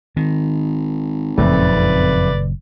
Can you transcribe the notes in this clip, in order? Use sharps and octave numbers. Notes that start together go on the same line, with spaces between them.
G#1 D#3
F#1 F2 A#2 C#3 A3 B4 D5